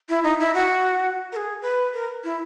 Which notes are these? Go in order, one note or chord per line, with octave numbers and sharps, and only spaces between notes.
E4
D#4
E4
F#4
A#4
G#4
B4
A#4
E4